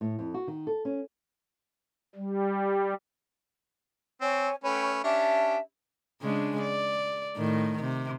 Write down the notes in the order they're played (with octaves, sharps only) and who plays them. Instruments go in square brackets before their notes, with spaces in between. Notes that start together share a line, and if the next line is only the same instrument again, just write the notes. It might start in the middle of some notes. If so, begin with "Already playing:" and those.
[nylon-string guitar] A2
F2
F#4
D#3
A4
C#4
[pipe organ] G3
[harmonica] C4 [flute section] C#5 G#5
[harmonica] A3 C#4 B4 [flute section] C#5 G5
[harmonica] C#4 D4 G4 [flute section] E5 A5
[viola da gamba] C#3 G#3 D4
D5
A2 D#3
C3